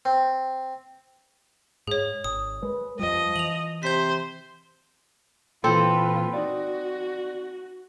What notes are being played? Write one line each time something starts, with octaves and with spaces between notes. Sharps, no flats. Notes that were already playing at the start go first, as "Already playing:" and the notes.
C4
G#2 G#4 C#5
G#1 D#6
G#3 B4
F2 F3 G3 D#5
E3 F7 F#7
C3 C5 G6 B6
A#2 E3 C4 F4 A4 B4
D#4 F#4 D5